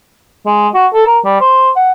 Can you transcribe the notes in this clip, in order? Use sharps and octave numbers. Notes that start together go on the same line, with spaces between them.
G#3
F#4
A4
A#4
G3
C5
F#5